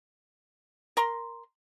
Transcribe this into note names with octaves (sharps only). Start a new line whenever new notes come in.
A#4 A#5 C6